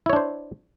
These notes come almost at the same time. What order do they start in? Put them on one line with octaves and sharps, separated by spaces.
E4 C#5 D4 C5